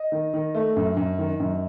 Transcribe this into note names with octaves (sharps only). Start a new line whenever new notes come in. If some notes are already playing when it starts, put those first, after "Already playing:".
Already playing: D#5
D#3
D#3
A3
F#2
F#2
D#3
F#2